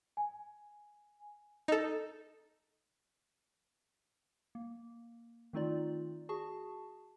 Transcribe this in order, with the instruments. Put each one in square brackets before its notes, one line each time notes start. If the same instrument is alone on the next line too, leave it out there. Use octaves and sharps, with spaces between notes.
[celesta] G#5
[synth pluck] D#4 A4
[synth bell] A#3
D#3 A3 C4 D#4 F4 D5
F#4 G#4 A5 C#6